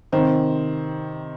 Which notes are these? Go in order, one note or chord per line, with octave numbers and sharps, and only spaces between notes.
C3 D#3 C5